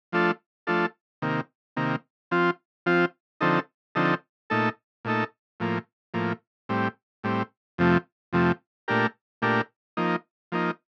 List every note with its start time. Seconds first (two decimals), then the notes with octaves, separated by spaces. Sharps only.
0.13 F3 A3 D4 F4 A4
0.67 F3 A3 D4 F4 A4
1.22 C3 D#3 A#3
1.77 C3 D#3 A#3
2.31 F3 C4 F4
2.86 F3 C4 F4
3.41 D3 F3 C4 D#4 A4
3.95 D3 F3 C4 D#4 A4
4.50 A#2 A3 D#4 A4
5.05 A#2 A3 D#4 A4
5.60 A2 F3 A#3
6.14 A2 F3 A#3
6.69 A2 G3 C4
7.24 A2 G3 C4
7.78 F2 C3 F3 A3
8.33 F2 C3 F3 A3
8.88 A#2 A3 D4 G4 A#4
9.42 A#2 A3 D4 G4 A#4
9.97 F3 A#3 D#4
10.52 F3 A#3 D#4